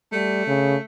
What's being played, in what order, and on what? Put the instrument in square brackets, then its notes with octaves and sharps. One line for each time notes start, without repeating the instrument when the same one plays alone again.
[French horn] G3 [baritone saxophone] A3
[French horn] C#3